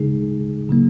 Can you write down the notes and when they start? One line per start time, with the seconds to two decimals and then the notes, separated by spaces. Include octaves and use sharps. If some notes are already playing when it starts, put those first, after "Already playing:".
Already playing: C#3 G#3 D#4 G#4
0.69 C#3 F#3 A#3